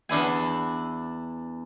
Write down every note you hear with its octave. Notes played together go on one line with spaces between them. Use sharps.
E2 D4 E4 G#5